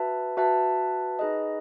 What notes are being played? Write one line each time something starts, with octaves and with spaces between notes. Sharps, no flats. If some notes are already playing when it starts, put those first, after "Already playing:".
Already playing: F#4 B4 E5 A5
F#4 B4 E5 A5
D#4 G#4 B4 D#5